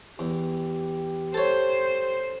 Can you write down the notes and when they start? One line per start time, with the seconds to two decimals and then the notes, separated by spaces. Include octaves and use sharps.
0.19 E2 G4
1.34 A4 C5 C#5